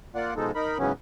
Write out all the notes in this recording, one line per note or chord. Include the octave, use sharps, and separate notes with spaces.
A#3 F4 D5 F#5
B2 F3 G#3 D#4 A4
D#4 A#4 B5
G#2 C#3 E3 F#3 B3 C#4